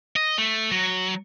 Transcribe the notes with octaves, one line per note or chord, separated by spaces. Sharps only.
D#5
A3
F#3